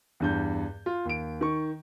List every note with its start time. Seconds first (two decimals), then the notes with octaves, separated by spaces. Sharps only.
0.20 E2 G2 G6
0.86 F4
1.05 D#2 D7
1.41 D#3 C#6